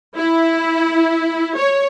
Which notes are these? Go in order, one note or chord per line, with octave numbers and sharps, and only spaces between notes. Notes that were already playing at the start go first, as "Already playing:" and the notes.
E4
C#5